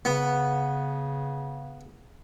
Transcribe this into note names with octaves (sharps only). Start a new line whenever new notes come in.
C#3 B3